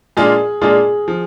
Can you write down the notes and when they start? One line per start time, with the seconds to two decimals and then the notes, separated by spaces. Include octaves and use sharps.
0.17 A#2 G#3 D4 F4 G#4
0.61 A#2 G#3 D4 F4 G#4
1.08 F3